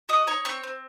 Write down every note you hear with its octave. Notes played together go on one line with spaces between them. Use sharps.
F#4 D#5 D#6
D#4 C#5 C#6
C4 C#5 C#6
C4